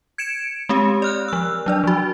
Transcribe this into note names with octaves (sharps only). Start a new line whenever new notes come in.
G#6 C#7 D7 E7
G#3 C4 G4
D5 F6 F#6
F3 E6
F#3 D4 D5
F3 F#4